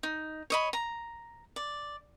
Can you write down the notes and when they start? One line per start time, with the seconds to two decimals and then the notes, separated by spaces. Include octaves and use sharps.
0.03 D#4
0.50 C#5 D#5 B5
0.73 A#5
1.56 D5